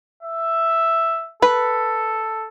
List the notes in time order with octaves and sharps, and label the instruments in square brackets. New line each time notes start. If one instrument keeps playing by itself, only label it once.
[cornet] E5
[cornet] A4 [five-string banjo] B4